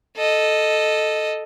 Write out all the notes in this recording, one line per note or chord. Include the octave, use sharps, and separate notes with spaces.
A4 D#5